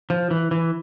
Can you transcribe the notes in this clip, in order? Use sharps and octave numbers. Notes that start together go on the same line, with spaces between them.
F3
E3
E3